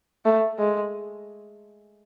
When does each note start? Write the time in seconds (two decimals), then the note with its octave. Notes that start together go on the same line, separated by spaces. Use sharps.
0.25 A3
0.58 G#3